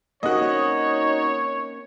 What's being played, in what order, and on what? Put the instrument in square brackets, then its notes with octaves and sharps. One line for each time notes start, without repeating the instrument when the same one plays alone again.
[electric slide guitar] A#3 C4 C#4 [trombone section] D#4 [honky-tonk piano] F#4 D#5 [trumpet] C#5